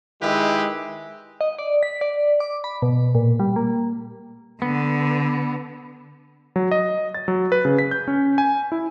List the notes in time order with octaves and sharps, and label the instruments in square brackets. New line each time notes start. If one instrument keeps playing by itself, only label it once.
[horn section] D#3 G#3 E4 G4 B4
[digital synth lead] D#5
D5
B6
D5
D6
B5
B2
A#2
G3
A#3
[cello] D3 [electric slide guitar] B3
[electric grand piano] F#3
D#5
A6
F#3
B4
C#3
B6
G6
C#4
G#5
E4